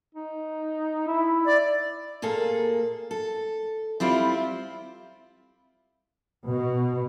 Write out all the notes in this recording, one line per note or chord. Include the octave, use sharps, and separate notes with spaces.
D#4
E4
D5
A#2 A#3 G#4 A4
A4
G3 C4 E4 F4
B2